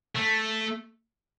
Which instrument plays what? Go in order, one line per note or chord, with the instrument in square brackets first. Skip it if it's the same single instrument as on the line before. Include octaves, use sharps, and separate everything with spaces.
[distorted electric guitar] A3